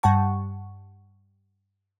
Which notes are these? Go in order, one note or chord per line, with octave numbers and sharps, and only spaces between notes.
G2 G3 F#5 A5 C#6